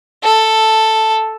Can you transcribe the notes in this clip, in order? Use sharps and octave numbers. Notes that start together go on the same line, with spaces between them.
A4